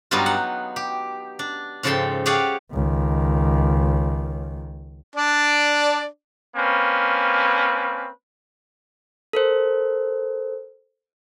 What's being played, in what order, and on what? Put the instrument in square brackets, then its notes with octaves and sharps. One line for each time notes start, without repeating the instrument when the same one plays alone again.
[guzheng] G2 F#3 G3 B3 D#4 F4
F#5
G4
D4
G#2 C#3 F3 A4 G5 C6
G4 G#4 C#5 D5 F5 F#5
[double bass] C#2 D#3
[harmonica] D4 D5
[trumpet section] A#3 C4 C#4 B4
[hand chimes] A4 A#4 C5